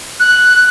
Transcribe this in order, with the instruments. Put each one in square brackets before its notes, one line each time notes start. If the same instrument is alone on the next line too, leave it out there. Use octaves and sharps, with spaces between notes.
[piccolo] F#6